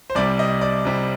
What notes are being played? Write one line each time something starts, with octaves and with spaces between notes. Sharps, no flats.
C5
C2 C3 G3 D5
D#5
D5
C2 C3 G3